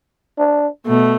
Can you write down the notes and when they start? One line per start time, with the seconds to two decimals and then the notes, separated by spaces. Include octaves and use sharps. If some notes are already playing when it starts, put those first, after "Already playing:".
0.38 D4
0.87 B2 A3